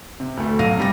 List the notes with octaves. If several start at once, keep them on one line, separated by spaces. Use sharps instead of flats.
C3
D2 A3
B1 F#3 F5 A#6 D#7
C3 G3 A#6